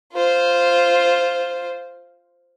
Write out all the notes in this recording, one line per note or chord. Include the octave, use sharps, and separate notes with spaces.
F4 C5